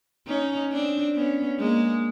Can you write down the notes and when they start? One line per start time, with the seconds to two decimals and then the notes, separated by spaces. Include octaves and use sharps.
0.27 C#4 D#4
0.72 C4 D4
1.15 B3 C#4
1.59 G#3 A#3